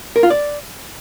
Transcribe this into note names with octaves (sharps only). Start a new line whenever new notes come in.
A#4
F4
D5